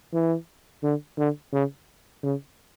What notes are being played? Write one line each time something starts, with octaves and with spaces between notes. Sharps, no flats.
E3
D3
D3
C#3
C#3